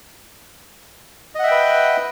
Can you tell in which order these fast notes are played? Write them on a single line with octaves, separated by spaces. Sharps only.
D#5 F#5 E5 G5 B4